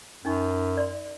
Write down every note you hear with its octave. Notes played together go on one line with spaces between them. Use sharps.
F#2 C#4 D#4 C#6
D5 C6